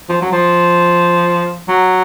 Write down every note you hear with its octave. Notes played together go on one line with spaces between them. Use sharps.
F3
F#3
F3
F#3